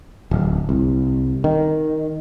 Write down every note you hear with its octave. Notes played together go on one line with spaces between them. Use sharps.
D1
C2
D#3